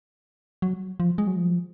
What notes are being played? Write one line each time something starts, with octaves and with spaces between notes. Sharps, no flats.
F#3
F3
G#3
F#3
F3